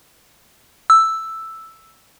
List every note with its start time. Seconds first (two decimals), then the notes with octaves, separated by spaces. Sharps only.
0.90 E6